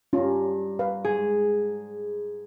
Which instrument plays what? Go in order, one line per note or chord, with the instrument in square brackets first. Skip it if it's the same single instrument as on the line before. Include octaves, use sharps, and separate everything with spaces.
[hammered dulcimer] G2 A#5 [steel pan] C#4 F4
[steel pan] B4 F5
[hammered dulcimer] G#2 [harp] G#4